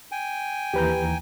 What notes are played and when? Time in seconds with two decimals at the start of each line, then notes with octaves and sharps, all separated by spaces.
0.12 G5 G#5
0.74 D#2 E3 G4 B4 A#5 G6